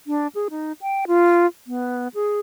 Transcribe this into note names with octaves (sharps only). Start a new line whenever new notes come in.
D4
G#4
D#4
G5
F4
B3
G#4